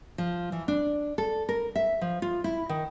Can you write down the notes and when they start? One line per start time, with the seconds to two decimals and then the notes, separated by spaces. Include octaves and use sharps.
0.18 F3
0.52 E3
0.68 D4
1.18 A4
1.49 A#4
1.76 E5
2.01 F3
2.22 F4
2.44 E4
2.69 D#3